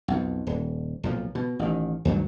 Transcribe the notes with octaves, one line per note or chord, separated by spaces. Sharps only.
B1 F2
D#1
B1 A#2 F3
B2
A1 D#3
D2 G2 D#3 F#3